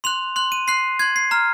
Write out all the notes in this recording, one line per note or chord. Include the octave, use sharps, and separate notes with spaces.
C6 F#6 F7
C6 F#6
D#7
C6 F#6 C7
C6 F#6 G#6
C7
A#5 F6